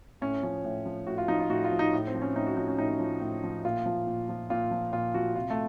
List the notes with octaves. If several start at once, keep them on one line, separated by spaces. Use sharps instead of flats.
A2 C#4
F3 C#4
A2
F3
A2 F#4
F4
F3 D#4
F4
A2 F#4
F4
F3
D#4
A2
C4
F3
C#4
A2 D#4
F#4
F3 D#4
C#4
A2 D#4
F3
A2
F3
A#2 F4
F3
A#2
F3
A#2 F4
F3
A#2 F4
F3 F#4
C3 F4
A3